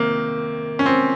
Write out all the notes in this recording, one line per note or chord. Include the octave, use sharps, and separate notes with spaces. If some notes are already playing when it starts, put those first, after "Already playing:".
Already playing: C3 D#3 A#3
C#4
C4